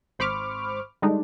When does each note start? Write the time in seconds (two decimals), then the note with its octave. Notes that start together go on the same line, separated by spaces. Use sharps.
0.19 G#1 C5 B5 C#6 D6 F6
1.02 D3 G3 G#3 D4 D#4